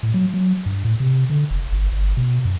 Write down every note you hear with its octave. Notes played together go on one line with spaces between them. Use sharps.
A2
F#3
F#3
G2
A2
C3
D3
F1
G1
G1
B2
F#2